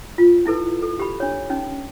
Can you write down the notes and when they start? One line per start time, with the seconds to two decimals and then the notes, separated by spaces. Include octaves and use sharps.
0.18 F4
0.45 D#4 E4 A4 B4
0.82 A4
0.99 G4 B5
1.20 D4 C#5
1.50 C#4 D#4